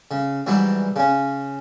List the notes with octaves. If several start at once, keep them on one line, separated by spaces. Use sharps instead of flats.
C#3
G#2 E3 F#3 G3
C#3 C#4